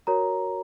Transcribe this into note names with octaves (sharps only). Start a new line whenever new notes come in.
F#4 A#4 C#5 A#5